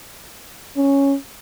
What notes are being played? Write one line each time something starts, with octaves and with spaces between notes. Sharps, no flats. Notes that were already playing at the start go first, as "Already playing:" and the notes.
C#4